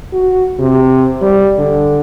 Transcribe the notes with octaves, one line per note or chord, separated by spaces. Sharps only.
F#4
C3
G3
D3